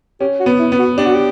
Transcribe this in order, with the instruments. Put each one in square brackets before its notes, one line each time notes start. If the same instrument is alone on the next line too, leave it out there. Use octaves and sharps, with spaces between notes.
[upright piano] C#4 [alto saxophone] G4
[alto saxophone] F#4
[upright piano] B3
[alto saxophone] E4
[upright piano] B3
[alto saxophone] F#4
[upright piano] D4 [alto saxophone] G4
[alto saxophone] F#4
G4